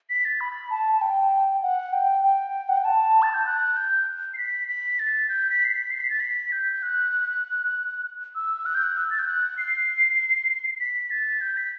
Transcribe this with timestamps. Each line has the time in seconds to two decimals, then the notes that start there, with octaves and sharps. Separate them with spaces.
0.09 B6
0.25 A6
0.40 B5
0.70 A5
0.92 A5
1.01 G5
1.63 F#5
1.93 G5
2.24 G5
2.69 F#5
2.77 G5
2.84 A5
3.22 A6
3.34 G6
3.46 F#6
3.76 G6
4.34 C7
4.38 B6
4.68 B6
4.99 A6
5.29 G6
5.50 B6
5.65 C7
5.70 B6
5.91 C7
6.00 B6
6.10 A6
6.20 B6
6.52 G6
6.73 G6
6.82 F#6
8.35 E6
8.66 F#6
8.74 G6
8.84 F#6
8.97 E6
9.11 A6
9.19 G6
9.27 F#6
9.58 C7
10.80 B6
11.11 A6
11.41 G6
11.57 B6